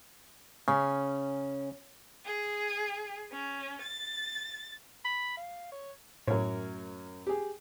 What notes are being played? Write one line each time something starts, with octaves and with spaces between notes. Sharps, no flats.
C#3 C#4
G#4
C#4
A6
B5
F5
C#5
F#2 A2 A#4 C#5
G4 G#4